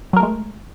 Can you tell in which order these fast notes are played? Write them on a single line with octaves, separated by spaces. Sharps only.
F#3 A#4 A3 G#3